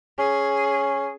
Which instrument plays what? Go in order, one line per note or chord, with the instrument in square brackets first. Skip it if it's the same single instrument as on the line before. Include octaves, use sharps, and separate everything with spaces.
[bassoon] C#4 [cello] G#4